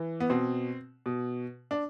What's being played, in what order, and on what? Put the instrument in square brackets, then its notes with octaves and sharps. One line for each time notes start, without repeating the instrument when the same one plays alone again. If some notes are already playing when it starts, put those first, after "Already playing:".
Already playing: [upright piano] E3
B3
B2 C4
B2
D4